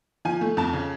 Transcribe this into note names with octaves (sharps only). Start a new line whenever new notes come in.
F3 G#5
A3
F2 A5
C#3